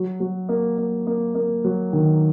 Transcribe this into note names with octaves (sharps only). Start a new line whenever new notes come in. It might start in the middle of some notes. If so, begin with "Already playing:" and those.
Already playing: F#3
F#3
A#3
A#3
A#3
A#3
F#3
D#3